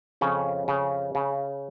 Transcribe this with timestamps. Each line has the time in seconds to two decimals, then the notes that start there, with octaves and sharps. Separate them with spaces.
0.21 F2 C#3 C#4
0.68 C#3
1.15 C#3